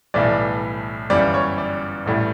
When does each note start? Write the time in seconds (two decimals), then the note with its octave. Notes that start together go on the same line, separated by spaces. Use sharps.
0.14 B1 A2 E3 G3 D5
1.10 G1 F#2 E3 G3 D5
1.34 C#5
1.58 D5
2.06 A1 A2 G3